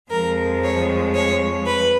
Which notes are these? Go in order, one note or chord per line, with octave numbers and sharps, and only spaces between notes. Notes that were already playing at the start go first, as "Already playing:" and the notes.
F2 F3 G#3 A#4
C#5
C#5
B4